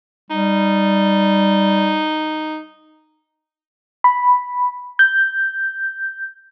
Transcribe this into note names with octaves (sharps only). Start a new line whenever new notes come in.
G3 D#4
B5
G6